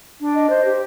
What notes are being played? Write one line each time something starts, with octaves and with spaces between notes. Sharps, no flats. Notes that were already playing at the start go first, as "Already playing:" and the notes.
D4
D#5
C5
G4